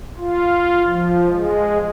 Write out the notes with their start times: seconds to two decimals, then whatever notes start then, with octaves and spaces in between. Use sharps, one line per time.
0.18 F4
0.84 F3
1.27 G#3